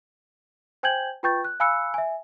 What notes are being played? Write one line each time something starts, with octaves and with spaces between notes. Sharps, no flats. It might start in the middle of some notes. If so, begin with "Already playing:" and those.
C5 G5 G#5 G6 G#6 F#7
F4 B4 G5 C#6 G6 A6
F#6
F5 G#5 B5 E6 F#6 C#7
E5 G#5